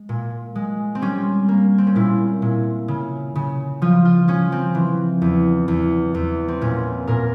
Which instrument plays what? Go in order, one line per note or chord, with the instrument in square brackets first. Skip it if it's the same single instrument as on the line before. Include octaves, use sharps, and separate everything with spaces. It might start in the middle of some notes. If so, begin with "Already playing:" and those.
Already playing: [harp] G#3
A#2
G#3
C4
G3 C#4
A#3
C4
C#4
A#2 E4
A#2
C#3
C#3
F3 F4
F4
F3 C#4
C4
E3
E2
E2
E2
C4
A#2 C#4
A#2 A#4